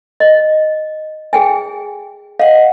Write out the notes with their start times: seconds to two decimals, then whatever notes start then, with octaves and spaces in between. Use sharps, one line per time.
0.20 D#5
1.33 G#4 G5 G#5
2.40 D#5 F5 F#5